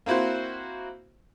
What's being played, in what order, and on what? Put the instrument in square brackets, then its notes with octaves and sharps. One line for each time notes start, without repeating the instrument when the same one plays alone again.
[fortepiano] A#3 C4 E4 F#4 C5